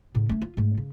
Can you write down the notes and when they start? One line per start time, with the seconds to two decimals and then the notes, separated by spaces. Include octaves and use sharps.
0.15 A2 C#3
0.29 A3 C#4
0.42 F4
0.57 G#2 A3
0.78 C#3